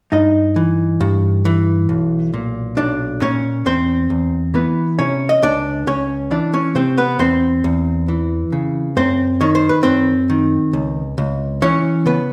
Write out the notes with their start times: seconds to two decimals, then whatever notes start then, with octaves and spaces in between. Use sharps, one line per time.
0.12 G2 D#4 D#5
0.56 E3
1.01 G2
1.45 E3
1.89 B1
2.34 A#2
2.77 B1 D4 D5
3.22 A#2 C#4 C#5
3.66 E2 C4 C5
4.10 E2
4.54 E3 B3 B4
4.99 C3 C#4 C#5
5.29 D#5
5.42 C#2 D4 D5
5.87 C#2 C#4 C#5
6.31 E3 D4 D5
6.54 C#4 C#5
6.75 C3 C4 C5
6.98 B3 B4
7.19 E2 C4 C5
7.64 E2
8.08 E3
8.52 C#3
8.97 F#2 C4 C5
9.41 D#3 C#5
9.55 C5
9.69 B4
9.83 F#2 C4 C5
10.30 D#3
10.73 C#2
11.18 C#2
11.62 E3 C#4 C#5
12.06 C#3 B3 B4